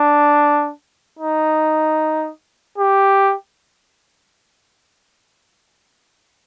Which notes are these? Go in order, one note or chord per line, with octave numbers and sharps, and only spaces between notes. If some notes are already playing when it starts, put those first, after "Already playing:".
Already playing: D4
D#4
G4